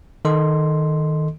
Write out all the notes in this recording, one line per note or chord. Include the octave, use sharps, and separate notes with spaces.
D#3 A4 D#5 C6